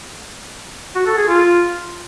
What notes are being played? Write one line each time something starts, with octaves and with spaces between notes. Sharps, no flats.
F#4
A4
G#4
F4